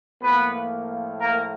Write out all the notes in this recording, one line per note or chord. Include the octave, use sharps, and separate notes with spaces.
A2 F3 A#3 B3 B4
A#3 A#4